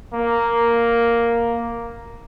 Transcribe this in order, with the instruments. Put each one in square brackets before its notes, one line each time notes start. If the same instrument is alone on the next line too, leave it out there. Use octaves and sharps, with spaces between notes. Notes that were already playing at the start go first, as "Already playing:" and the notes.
[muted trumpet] A#3